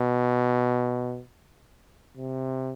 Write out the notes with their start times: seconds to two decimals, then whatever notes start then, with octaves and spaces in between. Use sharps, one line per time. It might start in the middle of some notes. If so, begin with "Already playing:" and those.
Already playing: B2
2.17 C3